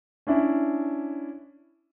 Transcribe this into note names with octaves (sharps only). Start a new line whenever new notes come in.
C#4 D4 E4